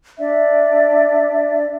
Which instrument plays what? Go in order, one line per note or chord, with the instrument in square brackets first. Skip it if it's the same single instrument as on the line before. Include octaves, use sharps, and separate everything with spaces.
[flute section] D4 D5 E5